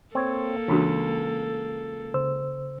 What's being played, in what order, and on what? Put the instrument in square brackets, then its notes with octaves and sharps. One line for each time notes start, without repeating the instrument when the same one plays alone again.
[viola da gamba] A#3 A4 [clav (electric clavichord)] C4 C#5
[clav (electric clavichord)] C#2 [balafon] E3 D4 F#4
[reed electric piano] C#3 C5 E6